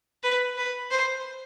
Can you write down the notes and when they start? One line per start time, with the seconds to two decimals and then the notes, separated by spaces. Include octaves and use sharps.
0.23 B4
0.58 B4
0.91 C5